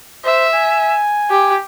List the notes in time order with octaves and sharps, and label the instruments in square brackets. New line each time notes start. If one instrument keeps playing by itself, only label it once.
[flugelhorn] C5 [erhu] E5
[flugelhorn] G#5
[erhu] G4